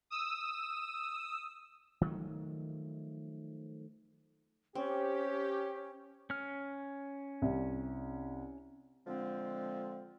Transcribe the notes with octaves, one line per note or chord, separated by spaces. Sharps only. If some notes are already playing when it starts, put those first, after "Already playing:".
D#6 E6
D#3 F3 F#3 A3
C4 C#4 G4
C#4 F6
C2
D3 F3 G#3 C4